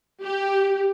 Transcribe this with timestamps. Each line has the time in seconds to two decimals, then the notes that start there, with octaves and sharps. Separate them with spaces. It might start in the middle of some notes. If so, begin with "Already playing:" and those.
0.22 G4